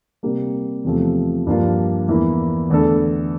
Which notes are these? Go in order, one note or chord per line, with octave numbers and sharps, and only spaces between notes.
C3 G3 A#3
E2 C3 F3 A3
G2 F3 A#3 F4
E2 E3 A#3 E4
E2 D3 A3 D4 A4